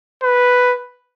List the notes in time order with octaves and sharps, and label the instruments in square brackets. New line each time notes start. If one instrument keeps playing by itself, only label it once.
[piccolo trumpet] B4